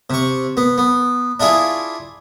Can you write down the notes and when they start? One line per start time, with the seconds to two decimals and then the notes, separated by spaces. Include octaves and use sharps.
0.10 C3 C#6
0.57 B3
0.78 B3
1.40 D4 E4 F4 G#4